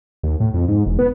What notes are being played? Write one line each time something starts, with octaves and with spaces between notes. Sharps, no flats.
D#2
A2
F2
G#2
E1
B3